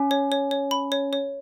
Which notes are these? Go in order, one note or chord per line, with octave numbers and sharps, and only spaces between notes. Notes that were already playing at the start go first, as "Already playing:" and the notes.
Already playing: C#4
C#5
C#5
C#5
B5
C#5
C#5